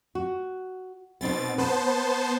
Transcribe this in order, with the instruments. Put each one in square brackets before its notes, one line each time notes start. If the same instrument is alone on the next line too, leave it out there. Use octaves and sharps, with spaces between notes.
[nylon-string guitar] F#4
[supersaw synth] B2 A6 [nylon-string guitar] B3 C4 D#4
[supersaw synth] B3 C5 A5 [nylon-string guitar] B4